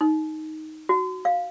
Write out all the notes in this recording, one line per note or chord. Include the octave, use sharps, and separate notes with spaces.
D#4
F#4
F5